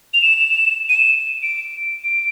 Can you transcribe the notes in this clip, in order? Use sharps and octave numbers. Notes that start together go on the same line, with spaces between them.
F7
E7
D#7
E7
D7
D7